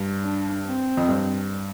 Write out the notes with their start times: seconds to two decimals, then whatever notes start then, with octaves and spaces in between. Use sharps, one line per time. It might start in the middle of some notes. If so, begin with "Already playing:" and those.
Already playing: G2
0.22 D4
0.65 C4
0.97 F2
1.09 G2